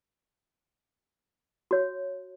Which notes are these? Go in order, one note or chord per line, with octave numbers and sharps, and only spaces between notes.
F#4 C#5